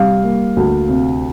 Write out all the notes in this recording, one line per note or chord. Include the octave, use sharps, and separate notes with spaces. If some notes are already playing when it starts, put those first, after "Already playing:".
Already playing: C3 G3 F5
A#3
D2
C3